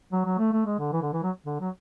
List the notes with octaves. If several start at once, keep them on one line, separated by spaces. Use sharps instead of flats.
F#3
F#3
A3
A3
G#3
D3
E3
D3
E3
F#3
D3
F#3